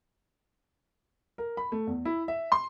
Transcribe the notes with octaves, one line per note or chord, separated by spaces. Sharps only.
A#4
B5
A3
E2
E4
E5
C6